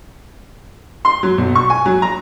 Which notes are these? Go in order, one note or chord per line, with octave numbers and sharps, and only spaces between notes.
C6
F#3
B1
C#6
G#5
F#3
A#5